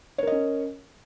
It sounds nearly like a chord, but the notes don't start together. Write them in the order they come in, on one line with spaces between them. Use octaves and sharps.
C#5 A#4 D#5 C#4